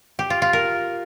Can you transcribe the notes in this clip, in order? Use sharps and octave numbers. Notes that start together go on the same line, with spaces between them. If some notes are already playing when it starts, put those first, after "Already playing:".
G4
F4
F4
A#4